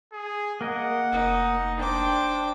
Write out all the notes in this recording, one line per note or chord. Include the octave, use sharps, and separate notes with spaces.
G#4
A#3 A#4 D#5 F#5
F1 D#4
D4 C5 G5 D6